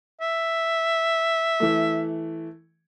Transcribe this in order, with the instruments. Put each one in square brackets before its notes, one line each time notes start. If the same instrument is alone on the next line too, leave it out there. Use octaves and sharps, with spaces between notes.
[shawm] E5
[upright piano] E3 A3